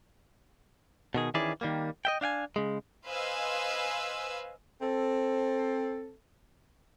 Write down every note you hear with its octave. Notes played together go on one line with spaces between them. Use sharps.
B2 D#3 G#4
D#3 E3 C#4 E4 G#4 D5
D#3 G3 A#3
D#5 E5 G5
D4 F5 G5 G#5
C#3 G#3
B4 C5 D#5 F5 G#5 E6
C4 A4